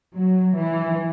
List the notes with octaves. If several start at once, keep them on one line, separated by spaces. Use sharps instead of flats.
F#3
E3